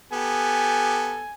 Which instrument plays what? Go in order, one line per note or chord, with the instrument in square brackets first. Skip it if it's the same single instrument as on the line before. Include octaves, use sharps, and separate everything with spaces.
[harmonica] B3 G4 A4 [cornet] G#5